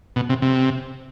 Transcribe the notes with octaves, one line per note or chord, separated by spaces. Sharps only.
B2
C3
C3